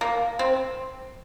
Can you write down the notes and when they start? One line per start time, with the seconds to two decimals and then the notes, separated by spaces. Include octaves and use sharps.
0.01 A#3
0.39 C4